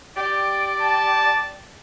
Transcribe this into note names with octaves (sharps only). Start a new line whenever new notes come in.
G4 D5
A5